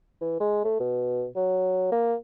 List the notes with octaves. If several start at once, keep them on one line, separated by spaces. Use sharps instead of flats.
E3
G#3
A3
B2
F#3
A#3